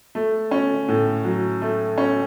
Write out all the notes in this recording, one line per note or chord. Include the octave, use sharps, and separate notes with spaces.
A3
C#4
A2
F#3
A3
C#4